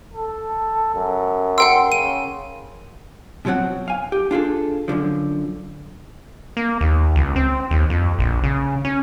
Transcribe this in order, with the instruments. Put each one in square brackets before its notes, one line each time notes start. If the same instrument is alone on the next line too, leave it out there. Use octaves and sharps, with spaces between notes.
[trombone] A4
F#2
[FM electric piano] A#4 C6 [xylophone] F#5 G5 E6
[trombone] C#3 [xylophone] D#7
[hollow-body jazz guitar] B2 F3 F#3 C4 F#5
F5 G#5
G4
D4 F4 G#4 A4
F#2 A#2 D3 F3
[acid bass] A#3
D#2
C#2
C4
D#2
F2
A#1
C#3
C#4